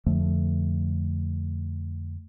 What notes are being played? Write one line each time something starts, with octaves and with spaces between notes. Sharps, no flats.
F2 D3 F3 A3